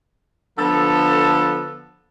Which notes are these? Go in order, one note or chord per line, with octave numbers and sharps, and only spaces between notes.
D3 F3 B3 A4